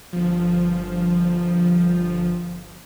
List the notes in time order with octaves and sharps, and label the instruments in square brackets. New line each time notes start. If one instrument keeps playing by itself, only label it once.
[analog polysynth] G1 F3